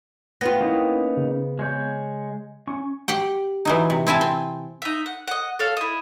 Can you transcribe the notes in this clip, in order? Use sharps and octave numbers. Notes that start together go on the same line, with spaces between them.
B3 C4 F4 A#6
A#3 C#4 D#4 E4
C#3
G#3 C#5 G6
C#4 C#6
G4 F#5 G5
E3 F#3 D#4
C3
C4 E4 G#5 A5
C4
D#4 E5
F#5
D#5 F#5
A4 C#5 F5
E4 D#5